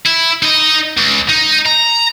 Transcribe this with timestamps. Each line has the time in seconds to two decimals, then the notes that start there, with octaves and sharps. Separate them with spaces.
0.06 E4
0.43 D#4 D#5
0.97 C#2
1.28 D#4
1.66 A#5